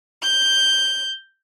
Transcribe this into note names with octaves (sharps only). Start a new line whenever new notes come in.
G6